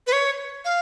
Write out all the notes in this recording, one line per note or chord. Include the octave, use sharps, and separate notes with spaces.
B4
C#5
F5